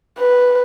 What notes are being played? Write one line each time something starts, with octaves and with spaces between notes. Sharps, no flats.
B4